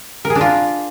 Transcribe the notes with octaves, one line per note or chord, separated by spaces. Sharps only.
A#4
G#4
D4
F4